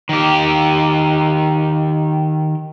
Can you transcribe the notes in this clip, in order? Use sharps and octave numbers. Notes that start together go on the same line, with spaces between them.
D#3 G4